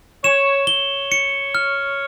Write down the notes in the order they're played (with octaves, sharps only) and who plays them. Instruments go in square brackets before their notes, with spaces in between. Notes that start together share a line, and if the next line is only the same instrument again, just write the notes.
[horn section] C#5 [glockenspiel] E7
[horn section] C#5 [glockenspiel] G7
[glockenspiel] C#7
F6